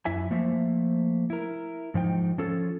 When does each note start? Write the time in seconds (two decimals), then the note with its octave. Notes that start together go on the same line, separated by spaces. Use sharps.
0.05 F#2 E4 E5 G#5
0.31 F3 A3 A#3 C5 E5
1.30 E4 A#4
1.94 G#2 F3 D#4 G5
2.38 F3 C#4 F4 A4